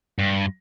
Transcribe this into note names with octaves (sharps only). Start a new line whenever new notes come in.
G2